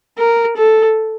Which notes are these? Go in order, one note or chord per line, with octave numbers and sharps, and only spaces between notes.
A#4
A4